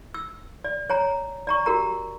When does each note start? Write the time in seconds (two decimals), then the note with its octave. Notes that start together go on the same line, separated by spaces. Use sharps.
0.14 E6
0.64 D5
0.90 C#5 G#5 A#5
1.47 D5 A#5 C#6
1.66 F#4 G4 A#4 A#5